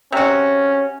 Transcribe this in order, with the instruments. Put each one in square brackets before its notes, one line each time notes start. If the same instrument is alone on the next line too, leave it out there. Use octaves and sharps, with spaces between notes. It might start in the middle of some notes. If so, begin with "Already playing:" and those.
[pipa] C3 F#4 [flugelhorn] C#4